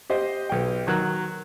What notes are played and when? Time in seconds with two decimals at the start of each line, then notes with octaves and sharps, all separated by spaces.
0.10 G4 C5 D#5
0.49 B1 G5
0.87 D#3 F#3 A#4 F#6